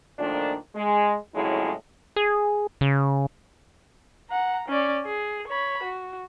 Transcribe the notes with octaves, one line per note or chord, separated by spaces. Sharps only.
A#2 D#3 F3 A3 D4
G#3
F2 A2 C#3 F#3 G#3 E4
G#4
C#3
F#5 A#5
C#4 D5
G#4
C#5 B5
F#4